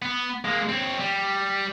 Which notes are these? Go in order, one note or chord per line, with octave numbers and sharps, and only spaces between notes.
B3
G#3 A#3
C4 C#5
G3